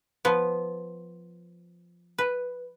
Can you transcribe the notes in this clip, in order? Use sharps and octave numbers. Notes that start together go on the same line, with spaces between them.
F3 B3
B4